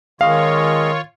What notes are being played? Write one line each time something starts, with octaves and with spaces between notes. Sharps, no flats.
D#3 G#3 C#4 F4 C#5 D#5 F5